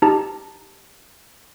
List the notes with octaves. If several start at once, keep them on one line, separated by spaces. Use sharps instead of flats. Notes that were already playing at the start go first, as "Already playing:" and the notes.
D#4 G4 A5 A#5